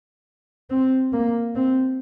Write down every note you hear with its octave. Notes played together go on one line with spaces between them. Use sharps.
C4
A#3
C4